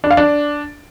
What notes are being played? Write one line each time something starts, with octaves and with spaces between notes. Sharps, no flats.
D4
F5
D4